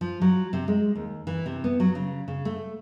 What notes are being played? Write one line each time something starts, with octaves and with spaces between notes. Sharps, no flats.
F3
F#3
C3
G#3
D#2
E3
C3
B3
F#3
C#3
C#3
A3